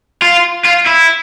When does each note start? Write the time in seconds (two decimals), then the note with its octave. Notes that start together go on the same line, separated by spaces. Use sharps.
0.22 F4
0.65 F4
0.86 E4